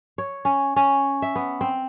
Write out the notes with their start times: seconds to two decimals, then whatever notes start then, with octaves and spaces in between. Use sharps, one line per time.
0.18 C#5
0.45 C#4
0.76 C#4
1.22 E5
1.35 B3
1.61 C4